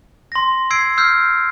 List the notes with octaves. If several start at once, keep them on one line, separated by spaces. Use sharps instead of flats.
C6 A#6
E6 G#6 C7 D7
E6 F6 G6 C7